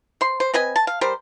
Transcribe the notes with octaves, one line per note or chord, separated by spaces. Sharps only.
C5 C6
C5
C4 B4 D#5 G#5
A5
F5
G3 A#4 C5